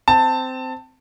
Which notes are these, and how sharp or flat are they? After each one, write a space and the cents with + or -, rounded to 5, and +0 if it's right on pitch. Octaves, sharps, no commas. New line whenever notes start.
C4 -15 A5 +15